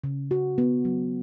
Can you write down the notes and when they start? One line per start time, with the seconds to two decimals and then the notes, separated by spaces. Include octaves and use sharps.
0.04 C#3
0.31 F#4
0.58 B3
0.85 F#3